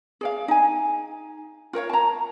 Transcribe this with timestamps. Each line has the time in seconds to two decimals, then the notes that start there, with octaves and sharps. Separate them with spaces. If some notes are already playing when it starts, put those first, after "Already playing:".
0.21 G#4 D5 F5
0.48 D#4 G#5
1.73 F4 A#4 C#5 F5
1.89 A5 A#5